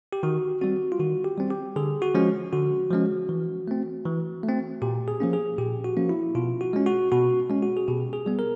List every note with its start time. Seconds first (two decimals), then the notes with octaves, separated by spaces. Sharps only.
0.13 G4
0.23 D#3 F#4
0.62 G3 C4 F#4
0.92 F4
0.99 D#3 F#4
1.24 G4
1.38 G3 C4
1.50 G4
1.76 D3 G#4
2.02 F#4
2.15 F3 G#3 C#4
2.53 D3 F#4
2.91 F3 G#3 C#4
3.29 E3
3.68 A3 C4
4.06 E3
4.44 A3 C4
4.82 A#2 G4
5.08 G#4
5.20 F3 A#3 C#4
5.33 G#4
5.58 A#2 G4
5.84 F#4
5.97 F3 A#3 C#4
6.09 E4
6.35 B2 F4
6.61 F#4
6.73 G#3 C#4
6.86 F#4
7.12 B2 F#4
7.50 G#3 C#4
7.62 F#4
7.77 G#4
7.88 B2 G4
8.13 G#4
8.26 G3 B3
8.39 A#4